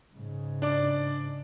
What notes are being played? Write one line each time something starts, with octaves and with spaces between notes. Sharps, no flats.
G#2 C#3
D4 D5 D6